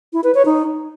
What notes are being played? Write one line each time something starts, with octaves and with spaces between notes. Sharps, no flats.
E4
B4
C#5
D#4